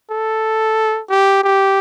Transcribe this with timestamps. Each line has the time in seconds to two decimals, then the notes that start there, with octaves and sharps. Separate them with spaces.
0.11 A4
1.10 G4
1.43 G4